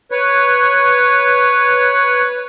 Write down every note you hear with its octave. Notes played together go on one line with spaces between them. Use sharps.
B4 C#5